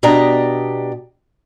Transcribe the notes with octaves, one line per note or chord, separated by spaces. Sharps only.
B2 D4 G4 D#5 A#5